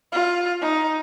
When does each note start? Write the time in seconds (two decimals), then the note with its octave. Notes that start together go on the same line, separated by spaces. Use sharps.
0.12 F4
0.61 D#4